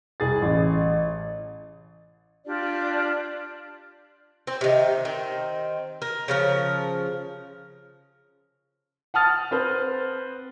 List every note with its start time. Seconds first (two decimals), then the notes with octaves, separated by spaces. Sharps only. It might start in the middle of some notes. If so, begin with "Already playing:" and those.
0.20 C2 G#4 A6
0.42 A1
2.45 D4 F4 G4 D5
4.47 C4
4.61 C3 D#3
5.05 D#3 C4
6.02 A#4
6.28 C#3 F3 A#4
9.14 F#5 A5 D#6 F6 A6
9.51 C4 B4 C5